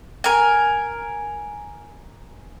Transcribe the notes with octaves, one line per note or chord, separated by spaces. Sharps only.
A#4 G#5